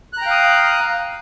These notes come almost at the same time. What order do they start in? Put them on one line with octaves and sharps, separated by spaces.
F#6 A#5 G5 F5 D#6